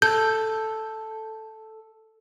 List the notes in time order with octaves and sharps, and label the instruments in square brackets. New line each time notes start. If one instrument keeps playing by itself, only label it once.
[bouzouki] A4 [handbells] G6